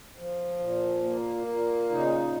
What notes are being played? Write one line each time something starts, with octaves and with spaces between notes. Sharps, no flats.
F3
A#2
A#3
A#2
C#3 D#4